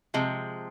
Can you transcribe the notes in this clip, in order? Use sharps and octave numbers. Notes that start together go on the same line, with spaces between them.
C3 F3 G#3